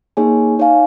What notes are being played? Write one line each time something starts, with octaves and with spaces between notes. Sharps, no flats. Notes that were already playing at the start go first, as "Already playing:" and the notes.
A#3 D#4 G#4 C#5 G#5
D#4 C#5 F5 G#5